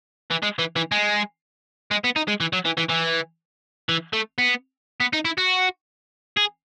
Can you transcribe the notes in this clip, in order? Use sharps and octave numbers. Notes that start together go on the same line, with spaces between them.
E3
G#3
E3
E3
G#3
G#3
B3
D#4
G#3
E3
F#3
E3
E3
E3
E3
A3
B3
B3
D#4
E4
F#4
G#4